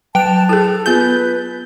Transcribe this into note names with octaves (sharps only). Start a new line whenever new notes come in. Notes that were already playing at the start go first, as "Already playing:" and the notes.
F#3 G5 A5 F#6 F7
E4 G#4 A4 A6
B3 F4 G#4 B4 G6